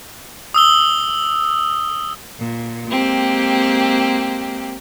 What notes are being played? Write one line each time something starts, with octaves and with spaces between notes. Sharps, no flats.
D#6 E6 G7
A#2
G#3 A#3 C4 G4